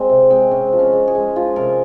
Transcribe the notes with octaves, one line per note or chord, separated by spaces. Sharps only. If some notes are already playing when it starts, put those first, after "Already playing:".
Already playing: G#3 C4
C3
G#3 C4
C3 C#4
F3
C#4
G#3
G#4
G#3
F3 F4
C3 A#4